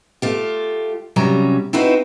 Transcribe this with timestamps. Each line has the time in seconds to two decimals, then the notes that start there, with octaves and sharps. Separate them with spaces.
0.22 A3 F4 G4
1.16 C3 F#3 G3 C#4 A#5
1.73 C4 D#4 E4 F#4 B4 C5